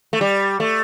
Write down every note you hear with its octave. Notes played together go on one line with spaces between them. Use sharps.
A3
G3
A3